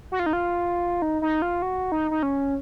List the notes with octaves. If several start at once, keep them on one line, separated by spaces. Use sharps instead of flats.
F#4
F4
D#4
F4
D#4
D#4
F4
F#4
D#4
D#4
C#4